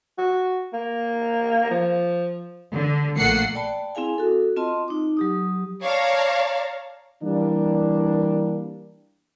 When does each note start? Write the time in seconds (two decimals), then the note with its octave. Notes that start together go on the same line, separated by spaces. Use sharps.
0.18 F#4
0.73 A#3
1.71 F3
2.74 D3
3.17 A#1 A3 A#3 F#5 C7 C#7
3.55 D5 G5 A5 B5
3.95 C4 E4 G#4 F5 G#5
4.18 F#4 A4
4.57 C4 F4 D#5 A5 C6
4.88 D#4 D6
5.17 F#3 G4 D#6
5.83 C#5 D5 F5 A5 A#5
7.22 E3 G3 A#3 D4